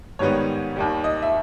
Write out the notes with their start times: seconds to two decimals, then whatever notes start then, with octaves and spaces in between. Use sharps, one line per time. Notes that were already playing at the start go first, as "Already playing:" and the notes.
0.19 G#2 D#3 G3 B3 C#5
0.76 D#2 D#3 G3
1.04 D#5
1.22 E5